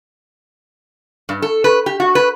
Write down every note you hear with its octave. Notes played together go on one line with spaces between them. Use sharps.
G2
A4
B4
G4
F#4
B4